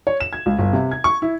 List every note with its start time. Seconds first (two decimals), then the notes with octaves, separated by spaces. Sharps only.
0.07 C#5
0.20 E7
0.33 G#6
0.46 C#2
0.58 G1
0.73 C3
0.91 G#6
1.04 C#6
1.22 E4